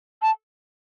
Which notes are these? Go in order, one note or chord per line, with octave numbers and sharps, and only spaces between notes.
A5